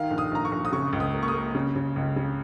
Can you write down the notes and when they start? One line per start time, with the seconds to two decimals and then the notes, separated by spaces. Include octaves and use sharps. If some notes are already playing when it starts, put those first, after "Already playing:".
Already playing: D#3 F5
0.10 A#1
0.18 D#6
0.32 A#1 A#5
0.45 C#6
0.52 A#1
0.65 D#6
0.72 C#3 C#6
0.93 C#2
1.00 D#6
1.14 A#3
1.23 C#6
1.28 D#6
1.34 A#3
1.55 C#3
1.76 C#3
1.96 C#2
2.16 C#3